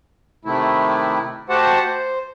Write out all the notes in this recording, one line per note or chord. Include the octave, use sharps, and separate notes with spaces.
C3 D#3 A3 E4
A3 F#4 G4 C5 F#5 A5
C5